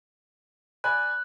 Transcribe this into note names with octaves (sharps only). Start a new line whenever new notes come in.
D5 G#5 B5 F#6